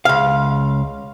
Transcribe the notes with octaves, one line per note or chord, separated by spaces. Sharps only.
C#2 F5